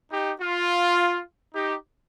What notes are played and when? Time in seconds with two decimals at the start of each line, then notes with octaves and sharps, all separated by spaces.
0.11 D#4 G4
0.40 F4
1.54 D#4 G4